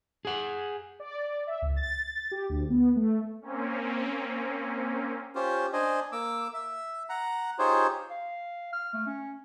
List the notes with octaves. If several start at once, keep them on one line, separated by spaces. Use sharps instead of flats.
G#4 F#5
D5
E5
C#2
A6
G4
D2
B3
A3
A#3 C4 C#4
C#4 F4 G4 C5
D4 C5 D#5 G#5
A#3 D6 E6
E5
F#5 A#5
D#4 F4 G4 G#4 C5 C#5
F5
F6
A3
C#4